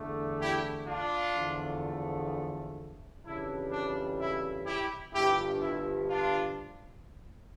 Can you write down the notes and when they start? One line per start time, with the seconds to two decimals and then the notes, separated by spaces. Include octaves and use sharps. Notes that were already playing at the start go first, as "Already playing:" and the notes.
Already playing: E2 D3 A3 D4
0.40 E4 G4
0.86 D4 F4
1.34 E2 D3 F3 A3
3.24 F2 C#3 E3 G3 D4 E4
3.70 D4
4.19 E4
4.65 E4 G4
5.13 G1 G2 F3 E4 G4
5.60 E4
6.08 D4 F4